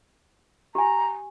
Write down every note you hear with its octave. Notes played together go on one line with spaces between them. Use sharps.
G4 G#5 A#5